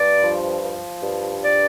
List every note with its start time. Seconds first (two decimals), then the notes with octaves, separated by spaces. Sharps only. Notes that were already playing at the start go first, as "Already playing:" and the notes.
Already playing: G2 D5
0.24 F3
0.63 F3
1.03 G2
1.44 D5